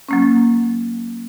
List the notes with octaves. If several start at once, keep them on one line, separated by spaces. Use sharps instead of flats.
F#3 A#3 C#4